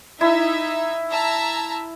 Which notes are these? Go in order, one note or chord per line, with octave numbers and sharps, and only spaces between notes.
D#4 E4 E5
E5 A5 A#5